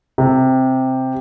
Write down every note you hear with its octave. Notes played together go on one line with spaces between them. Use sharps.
C3